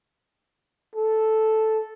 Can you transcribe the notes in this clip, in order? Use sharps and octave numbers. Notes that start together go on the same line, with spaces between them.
A4